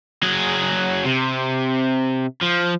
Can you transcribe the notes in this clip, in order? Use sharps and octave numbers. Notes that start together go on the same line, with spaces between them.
F#3 G#4
C3
F3